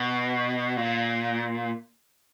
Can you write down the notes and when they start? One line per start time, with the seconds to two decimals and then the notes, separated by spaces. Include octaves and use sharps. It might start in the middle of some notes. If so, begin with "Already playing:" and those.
Already playing: B2
0.77 A#2